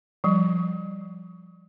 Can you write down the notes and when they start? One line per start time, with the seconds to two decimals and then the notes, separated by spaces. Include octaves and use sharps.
0.24 F3 G3